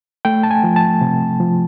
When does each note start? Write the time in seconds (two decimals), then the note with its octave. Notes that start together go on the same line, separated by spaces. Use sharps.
0.25 A3 G5
0.43 A5
0.51 G#5
0.64 F3
0.76 A5
1.01 C3
1.40 F3